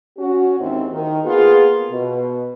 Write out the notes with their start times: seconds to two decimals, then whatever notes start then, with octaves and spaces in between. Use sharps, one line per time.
0.18 C#4 F#4
0.59 D#2 G#2 D#3 E3 C4 E4
0.92 D#3
1.24 A#3 B3 F4 G#4
1.90 B2